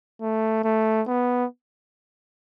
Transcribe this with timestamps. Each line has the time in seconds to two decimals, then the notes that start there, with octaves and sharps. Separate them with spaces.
0.21 A3
0.64 A3
1.07 B3